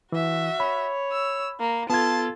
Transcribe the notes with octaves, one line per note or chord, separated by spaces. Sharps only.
E3 F#4 E5
C#5 B5
E6
A#3
B3 F4 A4 A5 G#6